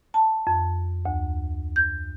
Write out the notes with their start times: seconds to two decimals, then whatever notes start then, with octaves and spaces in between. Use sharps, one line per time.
0.14 A5
0.47 F2
1.06 D2
1.76 G6